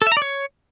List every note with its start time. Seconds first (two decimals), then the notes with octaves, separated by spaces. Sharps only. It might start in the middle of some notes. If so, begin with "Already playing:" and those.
0.02 A4
0.07 E5
0.12 A#5
0.17 D5
0.22 C#5